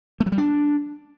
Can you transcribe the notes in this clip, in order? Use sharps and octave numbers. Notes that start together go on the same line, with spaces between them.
A3
F#3
G3
D4